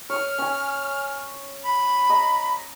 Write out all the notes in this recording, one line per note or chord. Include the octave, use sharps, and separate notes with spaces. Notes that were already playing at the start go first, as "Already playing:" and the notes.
C#5 D#6 F6
C#4 G#5
B5
D#5 A#5